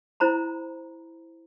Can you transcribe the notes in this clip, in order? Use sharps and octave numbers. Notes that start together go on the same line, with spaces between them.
E4 C5 A#5 B5